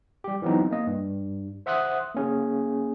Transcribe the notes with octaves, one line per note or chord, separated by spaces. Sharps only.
G3 G4
E3 F#3 B3 C4 D#4
A#3 D#5
G2
C5 E5 F#5 C6 D#6 F#6
A#3 C#4 G#4